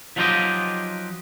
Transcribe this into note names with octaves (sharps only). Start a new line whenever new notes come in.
F3 F#3 D#4 F4 G4 D#5